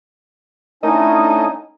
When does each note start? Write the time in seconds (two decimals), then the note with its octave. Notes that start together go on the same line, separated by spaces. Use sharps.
0.83 D3 A3 C#4 D#4 E4 D#5